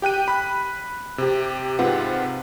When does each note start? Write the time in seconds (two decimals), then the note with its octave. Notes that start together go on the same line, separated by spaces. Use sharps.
0.02 G4 G5 F#6 D#7
0.28 B5 F#6
1.18 C3 G4
1.79 G#2 C3 C4 F4 B4 F#5